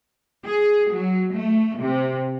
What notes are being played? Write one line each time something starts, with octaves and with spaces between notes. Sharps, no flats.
G#4
F#3
A3
C3